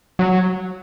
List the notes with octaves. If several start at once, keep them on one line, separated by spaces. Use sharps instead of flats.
F#3